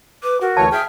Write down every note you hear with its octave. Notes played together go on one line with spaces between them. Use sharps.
B4 D6
F#4 A#4
D2 E3 C#5 A5
G#4 E5 G5 F6